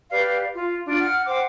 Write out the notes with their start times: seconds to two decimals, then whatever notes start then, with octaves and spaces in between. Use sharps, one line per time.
0.10 G4 B4 D5 F5
0.53 F4
0.85 D4 F4
0.99 F#5 F6
1.26 C5 F#5 G5 D6